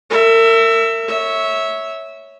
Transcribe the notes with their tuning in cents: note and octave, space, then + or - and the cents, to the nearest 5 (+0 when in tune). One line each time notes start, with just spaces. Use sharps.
A#4 -40 E5 +10
C#5 +0 E5 -15